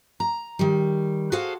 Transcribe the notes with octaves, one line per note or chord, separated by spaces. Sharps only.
A#5
D#3 G3
F#4 G#4 A4 C5 F5 F#5